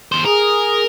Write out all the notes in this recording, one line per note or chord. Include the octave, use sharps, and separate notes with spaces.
D#2 C5
G#4 A#4